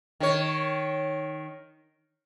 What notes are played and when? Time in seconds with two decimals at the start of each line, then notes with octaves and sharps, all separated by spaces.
0.20 D#3 C#5